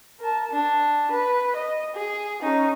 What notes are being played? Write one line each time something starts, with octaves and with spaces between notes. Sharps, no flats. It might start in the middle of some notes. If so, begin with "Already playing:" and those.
A#4 A5
D4
B4
D#5
G#4
C#4 D#4